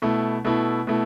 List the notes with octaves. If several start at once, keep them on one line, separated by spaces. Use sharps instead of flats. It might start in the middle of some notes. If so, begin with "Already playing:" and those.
B2 A3 E4
B2 A3 E4
B2 A3 E4